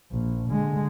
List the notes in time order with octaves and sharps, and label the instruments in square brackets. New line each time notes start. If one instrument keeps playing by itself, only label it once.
[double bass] A#1
D3 G#3